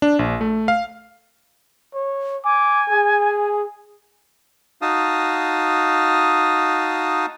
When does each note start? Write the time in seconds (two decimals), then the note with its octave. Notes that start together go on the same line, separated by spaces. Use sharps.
0.02 D4
0.19 A#1
0.41 A3
0.68 F5
1.94 C#5
2.44 G#5 D6
2.90 G#4
4.82 D#4 F#4 F5 A5 D#6